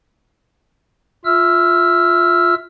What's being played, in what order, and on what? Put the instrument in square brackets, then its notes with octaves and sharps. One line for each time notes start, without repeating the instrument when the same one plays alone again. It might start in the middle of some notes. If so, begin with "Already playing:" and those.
[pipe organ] F4 E5 E6 F6